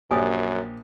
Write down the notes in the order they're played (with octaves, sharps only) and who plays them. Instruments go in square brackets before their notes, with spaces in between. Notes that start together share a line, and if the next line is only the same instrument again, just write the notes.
[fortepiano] A#1 G4 D5 [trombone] F#2 [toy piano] G#5 D#6